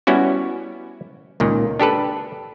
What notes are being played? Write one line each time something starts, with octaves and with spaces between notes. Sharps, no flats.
G3 B3 C#4 E4 F#4
C#2 A#2 D#3
D4 G4 A4 B4